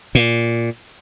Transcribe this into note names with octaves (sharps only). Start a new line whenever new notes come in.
A#2